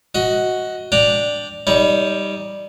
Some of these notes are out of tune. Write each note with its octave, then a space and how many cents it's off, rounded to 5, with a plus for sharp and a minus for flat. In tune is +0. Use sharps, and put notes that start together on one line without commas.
F#4 +0 D#5 +20
D4 +0 G5 +0 A#5 -5
G3 +5 D#4 +15 C#5 +40